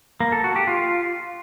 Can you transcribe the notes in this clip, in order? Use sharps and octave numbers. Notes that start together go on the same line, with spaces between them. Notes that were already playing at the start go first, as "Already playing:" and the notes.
A#3
A4
F#4
G4
F4